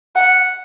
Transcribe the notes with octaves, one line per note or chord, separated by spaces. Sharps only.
F#5